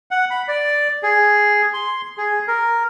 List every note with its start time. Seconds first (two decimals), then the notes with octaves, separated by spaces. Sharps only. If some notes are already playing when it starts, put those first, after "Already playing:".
0.11 F#5
0.30 B5
0.48 D5
1.03 G#4
1.74 C6
2.17 G#4
2.48 A#4